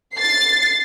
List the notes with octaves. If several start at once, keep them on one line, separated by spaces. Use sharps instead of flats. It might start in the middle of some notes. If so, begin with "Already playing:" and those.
A6 C7